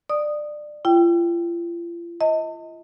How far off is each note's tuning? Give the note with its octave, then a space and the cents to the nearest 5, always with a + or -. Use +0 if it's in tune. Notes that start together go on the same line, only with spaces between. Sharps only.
D5 +20 D#6 -5
F4 -40 G5 +0
D#5 +30 A5 +40